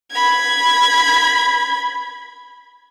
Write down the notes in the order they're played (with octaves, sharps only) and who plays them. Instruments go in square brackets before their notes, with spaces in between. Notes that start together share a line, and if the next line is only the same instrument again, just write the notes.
[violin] B5 G#6